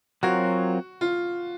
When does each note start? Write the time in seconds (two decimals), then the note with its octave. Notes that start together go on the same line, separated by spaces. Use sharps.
0.23 F#3 C4 F4 F#4 A#4 C#5
1.01 F4